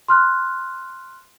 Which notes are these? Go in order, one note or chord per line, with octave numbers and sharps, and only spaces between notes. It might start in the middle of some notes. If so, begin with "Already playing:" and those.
C6 F6 F#6